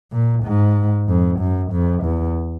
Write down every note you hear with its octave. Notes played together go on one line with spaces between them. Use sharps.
A#2
G#2
F2
F#2
F2
E2